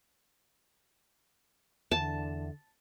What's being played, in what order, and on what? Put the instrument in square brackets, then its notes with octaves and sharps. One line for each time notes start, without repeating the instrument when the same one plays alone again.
[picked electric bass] E2 [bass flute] D3 [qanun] A5